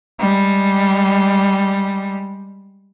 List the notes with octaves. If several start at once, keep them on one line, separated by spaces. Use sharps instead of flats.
G3 G#3